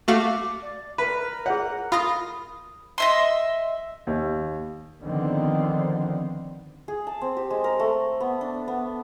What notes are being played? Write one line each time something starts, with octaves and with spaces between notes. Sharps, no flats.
A3 F#4 F5 D6
D5
A#4 B4 B5
G#4 C#5 F#5
F4 B5 D#6 A#6
D#5 E5 C6
D#2
D3 D#3 F3 B3 C4
G#4
A5
C4
G4
G#3
A#4
A3
B3
D4
B3